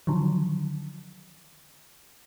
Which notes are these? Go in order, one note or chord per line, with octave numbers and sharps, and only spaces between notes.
D3 D#3 F3 F#3